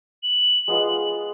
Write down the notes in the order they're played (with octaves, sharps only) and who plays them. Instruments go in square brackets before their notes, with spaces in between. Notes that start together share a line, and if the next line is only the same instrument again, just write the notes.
[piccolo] F#7
[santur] G#3 B3 F4